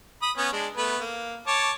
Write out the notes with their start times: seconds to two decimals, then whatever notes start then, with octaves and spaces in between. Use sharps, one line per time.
0.22 B5 D#6
0.37 B3 C#4
0.52 G#3 D4
0.77 A3 B3 B4
0.99 A#3
1.47 C#5 A5 D6